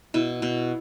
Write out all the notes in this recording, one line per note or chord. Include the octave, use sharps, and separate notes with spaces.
B2 E4
B2